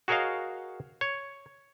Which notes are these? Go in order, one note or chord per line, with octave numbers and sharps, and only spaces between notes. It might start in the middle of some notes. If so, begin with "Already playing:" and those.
F#4 G#4 A#4 C#5 D#5 F5
C#5